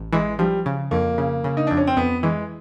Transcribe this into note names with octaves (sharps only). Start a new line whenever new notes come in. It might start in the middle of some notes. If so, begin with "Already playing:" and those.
Already playing: A1
E3 G#3
F3 G3
C#3
F2 A#3
C#3
C#3
D#4
F2 D4
C#4
C4
F2 B3
E3 G#3